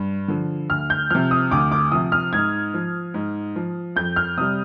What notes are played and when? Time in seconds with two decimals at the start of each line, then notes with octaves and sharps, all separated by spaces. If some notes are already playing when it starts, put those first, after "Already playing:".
Already playing: G2
0.28 D3 F3
0.70 D2 F6
0.90 G6
1.10 C3 F3 F6
1.31 D#6
1.51 D2 D6
1.72 D6
1.92 C3 F3 D#6
2.12 F6
2.33 G#2 G#6
2.74 F3
3.14 G#2
3.56 F3
3.96 F2 G6
4.16 F6
4.37 C3 G3 D#6